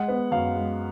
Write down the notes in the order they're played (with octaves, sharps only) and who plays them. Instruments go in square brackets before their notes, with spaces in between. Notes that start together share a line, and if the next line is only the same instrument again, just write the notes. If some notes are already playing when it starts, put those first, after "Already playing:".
Already playing: [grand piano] G#3 F#5
B3
F#2 F5
G#3